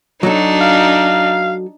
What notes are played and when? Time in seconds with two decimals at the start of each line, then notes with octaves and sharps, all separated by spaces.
0.23 F#3 D4 D#4 F#4 A4
0.61 F5